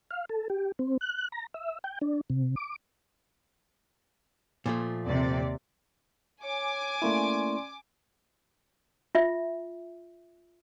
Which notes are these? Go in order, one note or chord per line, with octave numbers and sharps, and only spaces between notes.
F5
A4
G4
C4
F#6
A#5
E5
G5
D4
C3
D6
A#2 F3 A3
D#2 C3 D5
C#5 G#5 D6
A3 A#3 C#4 E4 D5 C6
F4 E5